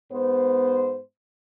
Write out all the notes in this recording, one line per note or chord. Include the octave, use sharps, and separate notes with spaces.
G#2 B3 C5